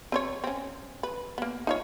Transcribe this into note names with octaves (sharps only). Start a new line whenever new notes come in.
C4 C5 C#5
C4 C#4
B4
A#3 B3
D#4 F4 C#5